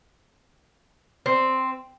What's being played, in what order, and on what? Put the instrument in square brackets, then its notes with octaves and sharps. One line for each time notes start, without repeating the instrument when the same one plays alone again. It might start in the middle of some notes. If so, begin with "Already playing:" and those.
[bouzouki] C4